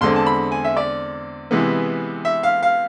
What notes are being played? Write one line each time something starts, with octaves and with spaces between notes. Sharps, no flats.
E2 D3 G#3 C4 C6
A5
B5
G#5
E5
D5
C3 E3 G#3 B3
E5
F5
F5